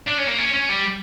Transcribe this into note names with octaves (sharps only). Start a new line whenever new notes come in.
D4
C#4
A#3
C#4
C#4
G3